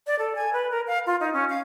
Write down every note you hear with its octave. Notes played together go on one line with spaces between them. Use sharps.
D5
A4
G#5
B4
A#4
F5
F4
D#4
C#4
F5